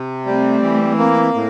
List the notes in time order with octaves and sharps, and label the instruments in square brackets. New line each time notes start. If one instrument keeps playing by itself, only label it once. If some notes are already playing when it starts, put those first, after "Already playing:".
Already playing: [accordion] C3
[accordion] G3 [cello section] A3 C4
[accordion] E3
A#3
A2